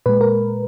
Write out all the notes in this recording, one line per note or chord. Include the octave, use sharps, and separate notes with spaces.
A#2 G#3 B4
A#4